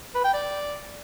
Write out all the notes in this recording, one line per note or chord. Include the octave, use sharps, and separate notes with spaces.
B4
G5
D5